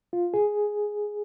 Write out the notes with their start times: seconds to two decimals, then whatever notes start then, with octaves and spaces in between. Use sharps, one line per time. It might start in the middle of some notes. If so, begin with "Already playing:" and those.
0.13 F4
0.34 G#4